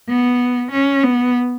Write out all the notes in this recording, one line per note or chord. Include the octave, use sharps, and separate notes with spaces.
B3
C#4
B3